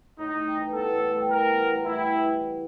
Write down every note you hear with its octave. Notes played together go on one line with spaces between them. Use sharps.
A2 D#4
G3
E3
B3 A4
A2
G3
E3 A#4
B3
A2
G3 E4
E3